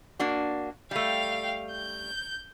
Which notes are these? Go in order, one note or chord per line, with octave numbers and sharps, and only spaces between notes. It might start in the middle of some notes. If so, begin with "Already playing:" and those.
A#3 D4 F#4
G3 A3 F5 G5
G6